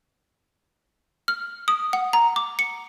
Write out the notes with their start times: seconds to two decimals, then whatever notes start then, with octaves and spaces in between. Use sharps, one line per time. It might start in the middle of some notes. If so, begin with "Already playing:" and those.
1.28 F6
1.68 D#6
1.93 F#5
2.13 A#5
2.36 D6
2.59 C#7